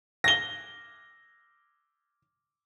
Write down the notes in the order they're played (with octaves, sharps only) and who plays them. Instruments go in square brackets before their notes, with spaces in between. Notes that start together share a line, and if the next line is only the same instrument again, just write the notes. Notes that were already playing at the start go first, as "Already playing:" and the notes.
[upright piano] A#6 G7